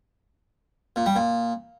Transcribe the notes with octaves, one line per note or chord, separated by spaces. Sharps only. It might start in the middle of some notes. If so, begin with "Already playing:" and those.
A#2
G3
A#2